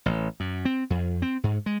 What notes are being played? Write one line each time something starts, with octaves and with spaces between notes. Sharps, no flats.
A1
F#2
C4
F2
C4
G#2
G#3